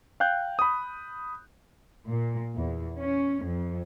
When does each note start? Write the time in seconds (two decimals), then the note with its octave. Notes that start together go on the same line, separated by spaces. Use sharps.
0.20 F5 G5 F#6 G6
0.59 B5 D#6
2.07 A#2
2.56 E2
2.98 C#4
3.44 F2